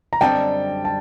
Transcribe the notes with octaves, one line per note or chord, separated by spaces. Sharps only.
A#5
F#2 D3 G3 C4 D#4 G5 A5
A5